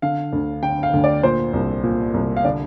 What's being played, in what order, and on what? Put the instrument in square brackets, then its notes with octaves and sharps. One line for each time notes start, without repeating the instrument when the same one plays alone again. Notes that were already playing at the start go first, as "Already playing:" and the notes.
[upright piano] D3 F5
D2
D3 G5
F5
D2
D5
A#2 C5
C2
A#2
C2
F5
D3 D5